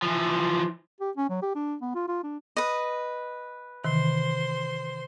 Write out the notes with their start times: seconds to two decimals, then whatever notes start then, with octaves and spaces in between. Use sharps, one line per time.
0.02 E3 F3
1.00 G4
1.17 C#4
1.29 F#3
1.42 G4
1.55 D4
1.82 B3
1.95 F4
2.08 F4
2.24 D4
2.57 B4 D#5
3.84 C3 D#3 E3 C5 C6